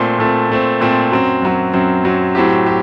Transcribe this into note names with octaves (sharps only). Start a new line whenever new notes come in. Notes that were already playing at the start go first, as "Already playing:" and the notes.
Already playing: A#2 A3 C4
A#2 A3 C4
A#2 A3 C4
A#2 A3 C4
F#2 F#3 C4
F#2 F#3 C4
F#2 F#3 C4
F#2 F#3 C4
A2 F#3 C4 G4
G4